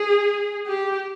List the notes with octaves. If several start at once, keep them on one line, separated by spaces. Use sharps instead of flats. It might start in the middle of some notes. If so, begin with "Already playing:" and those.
Already playing: G#4
G4